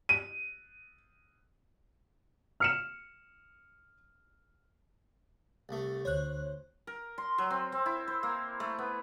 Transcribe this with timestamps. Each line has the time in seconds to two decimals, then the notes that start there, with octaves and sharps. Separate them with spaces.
0.09 D#7
2.60 F6 C#7 E7
5.69 C2 A3
6.05 D2 C5 C#5 F#6
6.87 A#4
7.18 C6
7.38 F#3
7.51 C4
7.72 C4
7.86 E4
8.08 C5
8.23 A#3
8.60 A3
8.78 B3